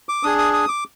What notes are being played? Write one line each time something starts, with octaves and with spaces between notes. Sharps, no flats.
D6
D4 G#4 D#6
D#6
D#6
D6